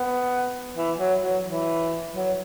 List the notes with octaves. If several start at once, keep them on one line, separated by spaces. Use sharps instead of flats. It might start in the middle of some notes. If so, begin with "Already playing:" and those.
Already playing: B3
E3
F#3
F#3
E3
F#3